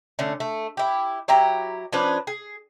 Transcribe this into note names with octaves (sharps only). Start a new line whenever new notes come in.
D3 A3 C#4
A3
E4 G4
F#3 E4 G4 A#5
F3 C#4 D4 B4
G#4